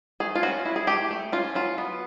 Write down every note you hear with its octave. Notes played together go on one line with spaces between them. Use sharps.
A3 G#4
F4
C#4 F#4
E4
G#4
A3 G4
A3
C#4 F4
F#3 F4
B3